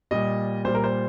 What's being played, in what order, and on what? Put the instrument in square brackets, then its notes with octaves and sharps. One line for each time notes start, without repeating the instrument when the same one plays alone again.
[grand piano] A#2 G3 D#5
A#2 G3 C5
A#4
C5